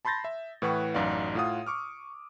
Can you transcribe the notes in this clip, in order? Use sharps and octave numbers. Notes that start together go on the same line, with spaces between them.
A5 B5 C6 G6 A6 A#6
E5
A2 E3 B4 F#5 G5 C#6
A1 F#2 D#4 F#4 D5 F5
A2 F4 F5 F#5 D#6
C#6 D6 F6